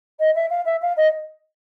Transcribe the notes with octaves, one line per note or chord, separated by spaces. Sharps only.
D#5
E5
F5
E5
F5
D#5